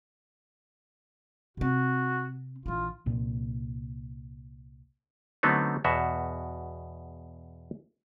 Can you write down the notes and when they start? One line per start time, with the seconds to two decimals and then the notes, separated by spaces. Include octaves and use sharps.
1.57 C3 C4 F#4
2.66 A#1 E3 F4
3.06 C2 A#2
5.43 D3 F#3 A3 B3 C4 D#4
5.84 E2 B2 F#4 E5